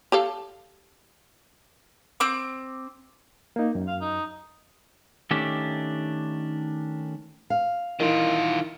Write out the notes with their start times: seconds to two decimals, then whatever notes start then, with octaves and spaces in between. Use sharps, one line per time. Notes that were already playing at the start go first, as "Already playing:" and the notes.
0.12 G4 A4 F5
2.20 C4 D6
3.56 A#3 D#4
3.75 F#2
3.87 F5
4.01 D#4
5.31 D#3 A3 C#4 D4 G4
7.50 F5
8.00 D#3 E3 F4 A#4 D#5